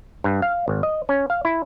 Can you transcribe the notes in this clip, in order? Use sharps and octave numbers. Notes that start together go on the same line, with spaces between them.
G2
F5
G#1
D#5
C#4
F5
E4